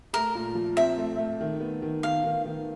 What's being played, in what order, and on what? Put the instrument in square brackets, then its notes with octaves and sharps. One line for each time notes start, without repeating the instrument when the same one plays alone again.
[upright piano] A3 [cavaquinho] A#4
[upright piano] A#2
F3
[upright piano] C4 [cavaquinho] E5
[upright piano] A3
A3
D#3
B3
D#3
[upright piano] D#3 [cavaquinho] F5
[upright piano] D#3
D#3